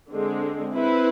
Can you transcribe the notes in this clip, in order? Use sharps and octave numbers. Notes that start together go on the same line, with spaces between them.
D3 G#3 C4
C4 E4 B4